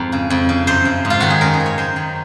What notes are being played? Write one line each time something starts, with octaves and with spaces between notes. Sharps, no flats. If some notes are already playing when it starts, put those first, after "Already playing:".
Already playing: F2 G#2 A#4
C#3
F2
C#3
F#2 C5
C#3
G#2
F4
D#3 F#4
G#4
F#2 A#4
G#4
C#3
C#5
F#2 C5
D#3